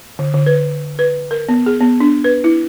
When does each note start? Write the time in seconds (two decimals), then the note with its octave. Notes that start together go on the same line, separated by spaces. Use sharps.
0.19 D3
0.34 D3
0.46 B4
0.99 B4
1.31 A#4
1.49 B3
1.66 G#4
1.81 B3
2.00 D4
2.24 B4
2.44 E4